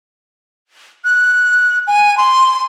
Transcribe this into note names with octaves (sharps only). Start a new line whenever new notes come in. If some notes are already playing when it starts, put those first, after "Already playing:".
F#6
G#5
C6